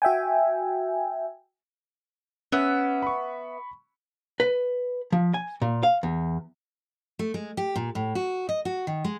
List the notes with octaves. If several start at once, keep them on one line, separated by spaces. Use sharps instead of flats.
F#4 E5 G5 G#5
B3 C#4 E5
B5 C#6
B4
F3
G#5
A#2
F5
E2
A3
G#3
G4
A#2
A2
F#4
D#5
F#4
D#3
G#3